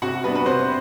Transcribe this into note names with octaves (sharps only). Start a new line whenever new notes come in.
C3 F#4 F#5
G3 B3 D4 B4
B4
C3 C5